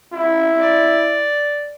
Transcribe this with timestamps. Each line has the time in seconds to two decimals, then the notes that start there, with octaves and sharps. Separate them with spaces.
0.13 E4
0.61 D5